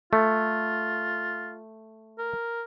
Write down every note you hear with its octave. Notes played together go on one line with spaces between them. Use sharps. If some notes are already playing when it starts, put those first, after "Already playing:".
A3 F4
A#4